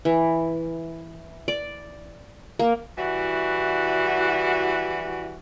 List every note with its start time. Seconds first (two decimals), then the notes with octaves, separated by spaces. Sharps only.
0.05 E3
1.48 D5
2.59 A#3
2.98 E3 G3 E4 F#4